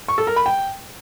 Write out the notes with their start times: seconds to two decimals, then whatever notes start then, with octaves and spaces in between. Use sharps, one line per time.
0.08 C#6
0.18 A4
0.27 A#4
0.36 B5
0.46 G5